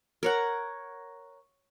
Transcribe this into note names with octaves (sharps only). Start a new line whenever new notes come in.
A#4 C#5 F#5